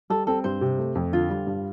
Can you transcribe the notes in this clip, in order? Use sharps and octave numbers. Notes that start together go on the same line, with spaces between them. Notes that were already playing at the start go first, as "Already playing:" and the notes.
G3 A4
C4 A4
G2 C5
C3
A3
F2
D3 F4
G3
G2